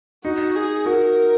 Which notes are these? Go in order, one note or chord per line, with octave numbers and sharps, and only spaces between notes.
D#4 F#4
G#4
F#4 A#4